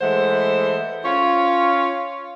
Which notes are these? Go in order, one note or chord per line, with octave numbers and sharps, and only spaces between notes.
E3 G#3 A3 C5 F#5
C#4 F4 C#5 F5